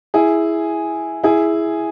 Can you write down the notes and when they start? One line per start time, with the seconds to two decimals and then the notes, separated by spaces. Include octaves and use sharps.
0.14 E4 G#4
1.24 E4 G#4